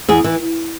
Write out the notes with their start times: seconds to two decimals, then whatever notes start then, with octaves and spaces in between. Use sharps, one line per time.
0.08 E2 G#4
0.24 E3